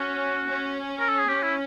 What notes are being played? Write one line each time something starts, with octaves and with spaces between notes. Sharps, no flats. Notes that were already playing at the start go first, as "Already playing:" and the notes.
Already playing: C#4 F#4
C#4
A#4
A4
G#4
C#4 G4
E4